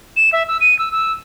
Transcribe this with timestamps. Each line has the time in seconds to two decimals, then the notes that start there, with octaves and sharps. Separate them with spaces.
0.16 E7
0.33 E5
0.48 E6
0.61 D#7
0.79 E6
0.92 E6